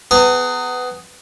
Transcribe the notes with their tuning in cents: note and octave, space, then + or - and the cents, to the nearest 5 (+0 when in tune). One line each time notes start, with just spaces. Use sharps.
B3 +20 G#4 +0 A#5 -35